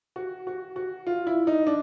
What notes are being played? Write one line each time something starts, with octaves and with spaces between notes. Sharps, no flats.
F#4
F#4
F#4
F4
E4
D#4
D4